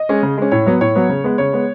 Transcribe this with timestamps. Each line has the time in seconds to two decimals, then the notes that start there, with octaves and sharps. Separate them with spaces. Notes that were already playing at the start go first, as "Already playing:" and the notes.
Already playing: D#5
0.09 G#3 C#4
0.23 C#3
0.38 G#3 C#4
0.52 A2 C#5
0.66 F#3 B3
0.81 A2 C#5
0.95 F#3 B3
1.09 C#3
1.24 G#3 B3
1.38 C#3 C#5
1.53 G#3 B3